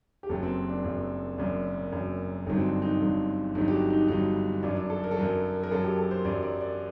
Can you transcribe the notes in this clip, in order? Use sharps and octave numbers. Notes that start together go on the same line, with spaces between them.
G4
F#1 F#2 F#3 A4
C4
D4
F#1 F#2 F#3
F#1 F#2 F#3 D4
F#1 F#2 F#3
G1 G2 D3 F#3 D#4
C4
D4
D#4
G1 G2 D3 F#3
G1 G2 D3 F#3 D#4
G4
F#4
D#4
G1 G2 D3 F#3 D#4
F#2 F#3 D4
D4
A4
A#4
A4
F#2 F#3 A#4
A#4
F#2 F#3 A4
G4
A4
C5
F#2 F#3 D5
D5
D5